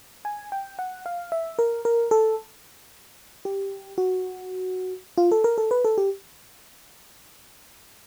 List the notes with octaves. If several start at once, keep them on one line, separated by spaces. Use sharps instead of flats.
G#5
G5
F#5
F5
E5
A#4
A#4
A4
G4
F#4
F4
A4
A#4
A4
B4
A4
G4